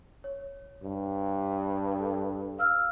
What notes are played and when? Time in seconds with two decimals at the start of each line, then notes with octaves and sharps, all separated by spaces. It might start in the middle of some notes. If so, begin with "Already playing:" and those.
0.24 C#5
0.83 G2
2.00 A4
2.59 F5 E6 F6